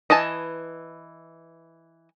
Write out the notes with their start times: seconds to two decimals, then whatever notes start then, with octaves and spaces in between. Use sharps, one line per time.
0.10 E3 D#5 G#5 A5